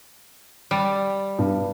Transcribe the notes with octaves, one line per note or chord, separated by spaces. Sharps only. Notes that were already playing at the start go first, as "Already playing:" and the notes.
G3
G2